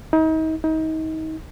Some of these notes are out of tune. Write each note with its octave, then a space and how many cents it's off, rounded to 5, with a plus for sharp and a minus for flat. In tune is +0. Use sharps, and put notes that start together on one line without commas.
D#4 +35
D#4 +30